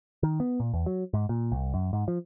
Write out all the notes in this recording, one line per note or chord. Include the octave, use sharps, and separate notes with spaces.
D#3
B3
A#2
E2
F#3
G#2
A#2
C2
F#2
G#2
F3